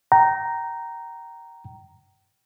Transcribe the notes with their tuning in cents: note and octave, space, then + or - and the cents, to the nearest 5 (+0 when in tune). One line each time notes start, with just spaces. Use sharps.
G5 -30 A#5 +0